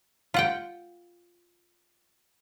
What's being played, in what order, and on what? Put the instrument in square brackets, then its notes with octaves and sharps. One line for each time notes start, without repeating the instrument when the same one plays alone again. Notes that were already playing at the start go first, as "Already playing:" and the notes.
[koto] F4 F#5 G5